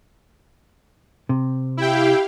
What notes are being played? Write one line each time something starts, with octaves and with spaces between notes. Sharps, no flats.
C3
E4 G4 F5 G5